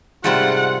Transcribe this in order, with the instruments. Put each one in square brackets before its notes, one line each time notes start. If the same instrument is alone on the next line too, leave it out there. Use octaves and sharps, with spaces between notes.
[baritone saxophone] G#2 [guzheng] C3 G3 A3 [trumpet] F4 [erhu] F#5